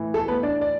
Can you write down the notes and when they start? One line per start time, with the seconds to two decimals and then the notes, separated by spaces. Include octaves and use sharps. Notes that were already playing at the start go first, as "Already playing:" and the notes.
Already playing: A2 E3
0.14 A3 A4
0.28 B3 B4
0.43 D4 D5
0.61 D5